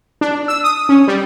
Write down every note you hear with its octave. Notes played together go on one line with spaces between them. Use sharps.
D4
E6
D#6
C#4
G3